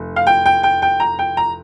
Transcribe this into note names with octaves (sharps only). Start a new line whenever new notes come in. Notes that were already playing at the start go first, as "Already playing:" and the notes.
Already playing: F1
F5
G5
G5
G5
G5
A#5
G5
A#5